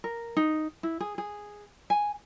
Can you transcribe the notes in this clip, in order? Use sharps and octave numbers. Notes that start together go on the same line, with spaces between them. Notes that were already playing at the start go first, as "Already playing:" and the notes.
A#4
D#4
E4
G#4
G#4
G#5